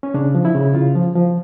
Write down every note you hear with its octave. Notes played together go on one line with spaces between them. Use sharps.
C#4
C#3 D4
F3
E4
C#3
C#3 F4
F3
F3